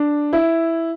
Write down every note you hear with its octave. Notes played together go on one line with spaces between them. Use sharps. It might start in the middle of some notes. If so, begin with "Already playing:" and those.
Already playing: D4
E4